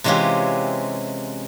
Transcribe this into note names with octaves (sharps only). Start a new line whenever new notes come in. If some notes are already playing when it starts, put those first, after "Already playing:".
C3 E3 G#3 C#4 F4 G4